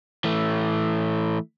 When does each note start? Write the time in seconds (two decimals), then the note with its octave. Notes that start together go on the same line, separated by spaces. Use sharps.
0.25 E3 A3